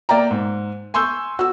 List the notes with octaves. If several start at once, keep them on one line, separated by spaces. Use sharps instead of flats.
A#3 D5 E5 G5 A#5
G#2
G#5 C6 C#6 E6 G6
F#4 E6